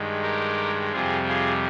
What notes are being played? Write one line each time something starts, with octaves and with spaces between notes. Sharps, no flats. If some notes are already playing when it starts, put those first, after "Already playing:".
Already playing: G2 D#3 G#3
G4 A#4
F2 C3 G3 F4 G#4
F4 G#4